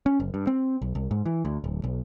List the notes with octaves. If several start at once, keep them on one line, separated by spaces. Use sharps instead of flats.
C#4
F#1
G2
C4
B1
C2
G#2
E3
D2
D1
B1